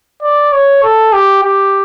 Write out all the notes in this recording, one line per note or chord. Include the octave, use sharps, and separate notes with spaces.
D5
C#5
A4
G4
G4